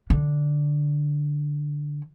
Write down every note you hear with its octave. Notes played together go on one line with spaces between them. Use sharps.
D3